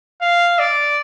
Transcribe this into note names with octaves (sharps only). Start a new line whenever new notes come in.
F5
D5